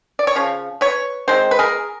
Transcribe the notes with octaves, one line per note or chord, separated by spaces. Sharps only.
D5
C#5
C#3 F3
B4 C#5
D#3 G#3 C4 C5
B4
G#4 A#4